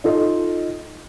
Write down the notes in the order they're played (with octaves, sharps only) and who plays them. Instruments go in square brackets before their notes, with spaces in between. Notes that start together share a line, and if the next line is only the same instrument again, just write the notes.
[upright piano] D#4 F4 A4 D#5